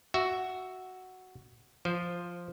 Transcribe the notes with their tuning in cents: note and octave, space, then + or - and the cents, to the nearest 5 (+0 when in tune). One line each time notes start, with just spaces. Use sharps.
F#4 +5 E5 +0
F3 +0 C5 +0